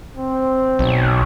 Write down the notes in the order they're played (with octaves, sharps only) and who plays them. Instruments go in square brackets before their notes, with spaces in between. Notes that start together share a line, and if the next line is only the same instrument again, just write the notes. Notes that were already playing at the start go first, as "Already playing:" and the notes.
[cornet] C4
[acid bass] B1